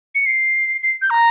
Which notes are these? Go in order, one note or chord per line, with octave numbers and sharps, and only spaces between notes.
C#7
C7
C7
G6
A#5